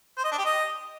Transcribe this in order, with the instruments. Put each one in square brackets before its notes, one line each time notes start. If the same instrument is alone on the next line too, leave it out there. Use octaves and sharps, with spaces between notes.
[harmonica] C5
D#5
D4
G4
D#5